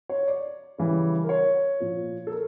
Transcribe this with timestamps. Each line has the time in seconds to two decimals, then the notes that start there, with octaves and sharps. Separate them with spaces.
0.10 C#5
0.28 D5
0.78 C#3 E3 G3
1.24 A#4
1.29 C#5
1.80 A#2 F3
2.27 A4
2.32 A#4